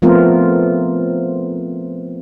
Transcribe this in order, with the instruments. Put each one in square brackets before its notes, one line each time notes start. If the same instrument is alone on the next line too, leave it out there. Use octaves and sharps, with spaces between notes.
[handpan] F3 A3 B3 C4 F4 A#4